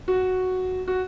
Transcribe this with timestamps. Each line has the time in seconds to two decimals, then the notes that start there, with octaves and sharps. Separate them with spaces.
0.08 F#4
0.88 F#4